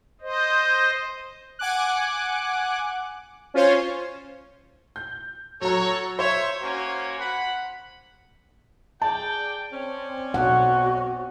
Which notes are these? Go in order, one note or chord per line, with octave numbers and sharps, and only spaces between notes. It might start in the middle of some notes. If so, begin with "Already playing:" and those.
C5 D#5
F#5 G#5 D6 F#6
C#4 F4 C5 C#5
G6
F#3 F#4 A4 C#5 A#5
C5 C#5 E5
A#3 C#4 F#4
F#5 B5
G#4 D5 G5 A5
C4 C#4 D5
B1 F#4 F#5